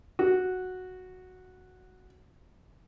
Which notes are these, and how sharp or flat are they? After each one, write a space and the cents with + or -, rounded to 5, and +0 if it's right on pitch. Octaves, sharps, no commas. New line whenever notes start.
F#4 -5